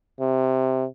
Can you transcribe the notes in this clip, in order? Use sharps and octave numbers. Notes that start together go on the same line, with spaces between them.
C3